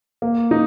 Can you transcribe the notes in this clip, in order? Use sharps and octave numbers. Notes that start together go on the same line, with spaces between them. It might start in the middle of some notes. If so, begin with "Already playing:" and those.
A#3
D#4